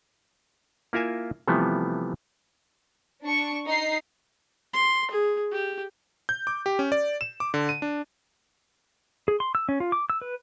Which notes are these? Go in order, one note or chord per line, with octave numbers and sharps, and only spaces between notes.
A#3 E4 F4 A#4 E5 G#5
C3 E3 F3 G3 A3 B3
D4 C#6
D#4 C7
C6
G#4
G4
G6
D6
G4
C#4
D5
E7
D6
D3
D#7
D4
G#4
C6
E6
C#4
F4
D6
E6
B4